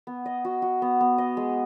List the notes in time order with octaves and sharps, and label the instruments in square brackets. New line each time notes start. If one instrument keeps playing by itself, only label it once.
[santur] B3
D#5
F#4
F#4
B3
B3
D#5
G#3